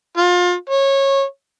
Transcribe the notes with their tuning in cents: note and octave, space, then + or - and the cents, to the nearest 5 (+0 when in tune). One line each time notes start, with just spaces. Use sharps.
F4 +30
C#5 -20